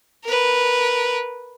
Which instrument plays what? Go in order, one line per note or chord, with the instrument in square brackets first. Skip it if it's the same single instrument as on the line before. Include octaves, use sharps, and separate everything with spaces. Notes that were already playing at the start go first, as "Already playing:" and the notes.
[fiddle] A#4 B4